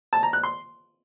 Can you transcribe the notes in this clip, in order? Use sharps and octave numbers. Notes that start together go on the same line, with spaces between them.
A5
A#5
F#6
C6